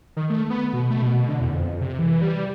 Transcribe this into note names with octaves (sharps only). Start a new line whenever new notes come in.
D#3
A3
B3
B2
A3
B2
D3
E2
F2
C3
E3
G3